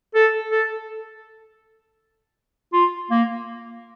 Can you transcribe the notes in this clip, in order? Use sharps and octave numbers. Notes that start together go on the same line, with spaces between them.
A4
A4
F4
A#3